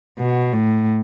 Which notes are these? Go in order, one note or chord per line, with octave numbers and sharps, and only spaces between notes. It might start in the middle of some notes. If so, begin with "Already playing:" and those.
B2
A2